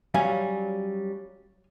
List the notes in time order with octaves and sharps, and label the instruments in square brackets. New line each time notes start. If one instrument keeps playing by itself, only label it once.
[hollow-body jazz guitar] F#3 G3 C#4 [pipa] F5 G#5